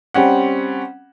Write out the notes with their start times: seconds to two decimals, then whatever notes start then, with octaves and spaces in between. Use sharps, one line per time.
0.14 G3 C4 C#4 F#5